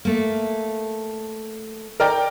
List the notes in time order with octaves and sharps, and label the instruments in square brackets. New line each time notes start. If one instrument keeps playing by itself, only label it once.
[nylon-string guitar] A3 A#3
[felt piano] A#4 D5 G5